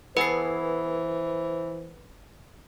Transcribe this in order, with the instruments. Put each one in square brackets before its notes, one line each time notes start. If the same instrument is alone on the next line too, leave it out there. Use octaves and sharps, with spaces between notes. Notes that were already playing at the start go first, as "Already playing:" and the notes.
[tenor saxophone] E3 [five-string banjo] B3 G#4 A4 [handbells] B4 C7 [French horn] C5